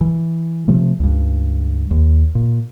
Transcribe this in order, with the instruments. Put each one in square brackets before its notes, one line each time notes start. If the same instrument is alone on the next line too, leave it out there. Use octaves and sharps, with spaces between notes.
[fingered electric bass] E3
C3 F3 A3
C#2 G2
D#2
A#2